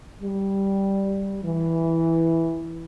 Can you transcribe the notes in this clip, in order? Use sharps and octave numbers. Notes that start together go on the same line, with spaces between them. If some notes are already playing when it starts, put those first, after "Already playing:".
G3
E3